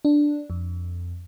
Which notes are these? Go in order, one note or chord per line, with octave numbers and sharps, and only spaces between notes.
D4
F2